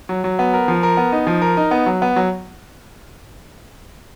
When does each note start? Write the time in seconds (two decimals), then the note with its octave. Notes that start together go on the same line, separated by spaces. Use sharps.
0.09 F#3
0.24 F#3
0.39 B3
0.54 A#4
0.68 F3
0.83 A#4
0.97 B3
1.12 D#4
1.27 F3
1.42 A#4
1.57 D#4
1.71 B3
1.86 F#3
2.02 B3
2.16 F#3